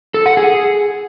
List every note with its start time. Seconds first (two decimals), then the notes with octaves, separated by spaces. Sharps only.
0.14 A4
0.26 F#5
0.37 G#4